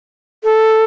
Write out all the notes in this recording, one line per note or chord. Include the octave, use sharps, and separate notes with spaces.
A4